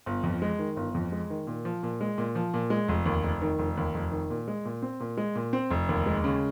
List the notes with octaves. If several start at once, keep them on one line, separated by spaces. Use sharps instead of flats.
G1
F2
G#3
D#3
G1
F2
G#3
D#3
A#2
F3
A#2
G#3
A#2
F3
A#2
G#3
F1
D#2
F1
D#3
F1
D#2
F1
D#3
A#2
G#3
A#2
C4
A#2
G#3
A#2
C4
F1
D#2
G#3
C#3